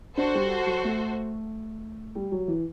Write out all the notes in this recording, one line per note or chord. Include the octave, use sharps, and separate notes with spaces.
D4 F#4 A4 C5
G3
F#3
A3
G3
F#3
E3